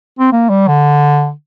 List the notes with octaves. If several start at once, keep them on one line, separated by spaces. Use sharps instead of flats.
C4
A#3
G3
D3